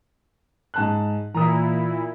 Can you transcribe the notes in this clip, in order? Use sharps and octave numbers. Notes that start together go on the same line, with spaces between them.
G#2 A5 F#6
A#2 E3 E4 A#5 D#6